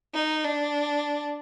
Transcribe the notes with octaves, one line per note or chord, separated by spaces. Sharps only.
D#4
D4